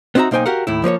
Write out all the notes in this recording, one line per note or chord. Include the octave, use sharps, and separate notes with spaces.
B3 C4 D#4 F#4 E5 A#5
B1 A#3 D#4 C5 G5 G#5
F#4 G4 A#4 F5 F#5
D#2 A2 E4
F3 A#3 B4 C#5